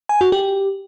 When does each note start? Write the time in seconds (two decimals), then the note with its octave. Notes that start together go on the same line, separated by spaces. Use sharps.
0.09 G#5
0.21 F#4
0.32 G4